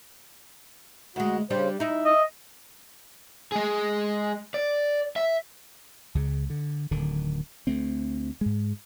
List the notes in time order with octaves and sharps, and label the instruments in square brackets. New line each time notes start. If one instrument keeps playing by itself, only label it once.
[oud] D2 G#3 [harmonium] F#4
[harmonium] C#3 C5 [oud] G3 D4 G4
[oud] D#4 E4 [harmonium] E5
[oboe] D#5
[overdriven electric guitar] G#3 G#4
D5
E5
[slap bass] C#2 C#3
D3
D1 D3 D#3
D2 A3 C4
G#2 G#3